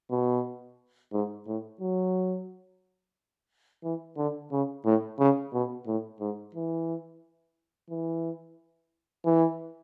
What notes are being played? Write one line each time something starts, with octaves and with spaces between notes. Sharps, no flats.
B2
G#2
A2
F#3
E3
D3
C#3
A2
C#3
B2
A2
G#2
E3
E3
E3